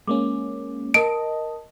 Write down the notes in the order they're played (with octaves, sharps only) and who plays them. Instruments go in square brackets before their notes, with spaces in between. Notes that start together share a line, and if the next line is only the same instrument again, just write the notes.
[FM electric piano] G#3 A#3 C#4 [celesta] D6
[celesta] A#4 A5 [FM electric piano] D#5 [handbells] D7